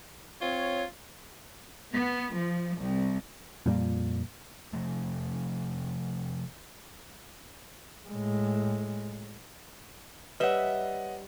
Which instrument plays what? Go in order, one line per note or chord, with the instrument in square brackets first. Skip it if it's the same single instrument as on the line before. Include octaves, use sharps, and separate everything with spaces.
[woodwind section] C4 C#5 [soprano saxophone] F4
[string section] B3
F3
C2
[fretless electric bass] F2 A#2 G3 A#3
[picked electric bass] C3 F3 A3
[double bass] A2 G#3
[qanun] G3 E5 [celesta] B4 C#5 [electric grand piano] D#5 F#5